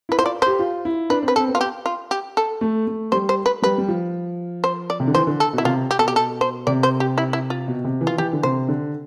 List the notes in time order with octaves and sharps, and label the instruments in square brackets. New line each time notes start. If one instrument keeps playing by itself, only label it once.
[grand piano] E4 [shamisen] B4
[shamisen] C5
[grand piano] F4 [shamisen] D5
[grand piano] G4 [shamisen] C5
[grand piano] F4
E4
[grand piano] D4 [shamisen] B4
[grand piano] C4
[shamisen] B4
[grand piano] C4 [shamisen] A4
[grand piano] B3
[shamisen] F4
G4
F4
G4
A4
[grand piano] A3
A3
[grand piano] G3 [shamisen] C5
[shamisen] C5
B4
[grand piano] G3 [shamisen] B4
[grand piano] G3
F3
[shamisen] C5
D5
[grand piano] C3
D3
[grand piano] E3 [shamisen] C5
[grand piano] D3
[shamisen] A4
[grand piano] B2
[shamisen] E4
[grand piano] C3 [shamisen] F4
[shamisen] G4
[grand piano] B2 [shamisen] A4
[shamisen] G4
A4
C5
[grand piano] C3 [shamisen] D5
[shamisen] C5
G4
E4
E4
F4
[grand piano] B2
C3
E3
[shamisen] F4
[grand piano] E3 [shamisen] G4
[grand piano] D3
[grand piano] C3 [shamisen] C5
[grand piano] D3